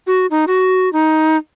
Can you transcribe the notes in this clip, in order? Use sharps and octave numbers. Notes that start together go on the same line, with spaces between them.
F#4
D#4
F#4
D#4